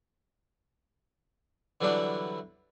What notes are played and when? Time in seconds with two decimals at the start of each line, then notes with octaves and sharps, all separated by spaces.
1.81 D3 E3 F#3 G3 D4 E4